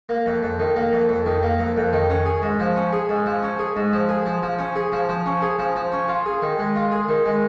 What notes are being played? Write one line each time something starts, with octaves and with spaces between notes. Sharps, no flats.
A#3
F2
F2
D#3
A#3
F2
F2
D#3
A#3
F2
F2
D#3
C#4
G#4
G#2
F3
C#4
G#4
G#2
F3
C#4
G#4
G#2
F3
G#4
F3
F3
C#4
G#4
F3
F3
C#4
G#4
F3
F3
C#4
F4
G#4
D#3
G#3
F4
G#4
D#3
G#3